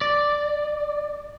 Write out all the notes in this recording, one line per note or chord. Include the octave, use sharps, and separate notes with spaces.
D5